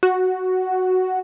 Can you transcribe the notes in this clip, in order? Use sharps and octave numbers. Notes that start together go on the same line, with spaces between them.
F#4